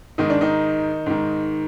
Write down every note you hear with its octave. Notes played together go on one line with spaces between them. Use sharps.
G#2 D#3 D#4
D4
D#3 D#4
G#2 D#3